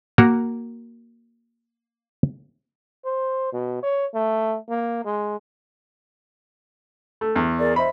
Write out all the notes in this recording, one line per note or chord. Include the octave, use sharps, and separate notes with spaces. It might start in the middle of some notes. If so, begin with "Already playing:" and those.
A#3 F#4 A#4 A#5
C5
B2
C#5
A3
A#3
G#3
A3
E2
G#4 A#4 D5
C5 D#5 E5 B5